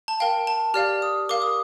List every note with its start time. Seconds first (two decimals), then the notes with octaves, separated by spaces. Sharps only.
0.08 A5
0.20 A#4 F5 G5
0.47 A5
0.74 G4 D5 F5 F6
1.02 D#6
1.29 A#4 F5 D6
1.42 D#6